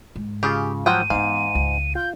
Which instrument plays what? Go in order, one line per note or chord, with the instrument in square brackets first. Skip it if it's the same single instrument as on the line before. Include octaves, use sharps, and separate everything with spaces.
[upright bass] G#2
[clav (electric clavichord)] C#3 F4 [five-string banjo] G4 G#4
[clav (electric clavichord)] F3 F#3 [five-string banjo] C5 F#5 G5 [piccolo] D#7
[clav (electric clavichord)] G#2 [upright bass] E3 B3 [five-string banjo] F5
[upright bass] C#2
[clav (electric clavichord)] F4 [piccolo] G6